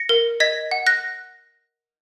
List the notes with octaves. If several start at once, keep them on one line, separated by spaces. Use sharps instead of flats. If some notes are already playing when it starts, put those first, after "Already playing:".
Already playing: A#6 C#7
A#4
D#5 G#6 B6
F#5
F#6 A#6